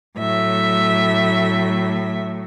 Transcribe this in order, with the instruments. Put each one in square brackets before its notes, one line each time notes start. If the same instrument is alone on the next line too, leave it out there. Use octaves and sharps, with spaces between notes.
[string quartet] A2 F#3 A3 E5